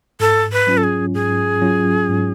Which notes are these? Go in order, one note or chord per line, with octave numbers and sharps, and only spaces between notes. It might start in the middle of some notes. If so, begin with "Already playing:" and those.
G#2 A4
B4
F#3 C#4 F4
A4
G#4
G#2 G#4
F#3 C#4 F4
G#2